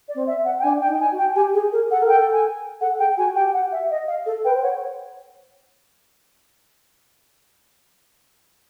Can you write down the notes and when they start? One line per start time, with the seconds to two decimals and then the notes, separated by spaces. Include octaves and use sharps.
0.08 D5
0.15 C4
0.27 E5
0.45 F#5
0.59 G5
0.63 D4 G#5
0.81 G5
0.88 D#4
1.00 G#5
1.12 F#4
1.18 G5
1.35 G4 G#5
1.54 G#4
1.72 A#4
1.91 A4 F#5
2.02 A#4
2.08 G5
2.13 A4
2.33 G#5
2.81 A4 F#5
2.99 G#4 G5
3.17 F#4 G#5
3.35 G4 G5
3.53 F#5
3.72 E5
3.90 D#5
4.08 F5
4.26 A4
4.44 B4 G5
4.54 C5
4.62 C#5 F#5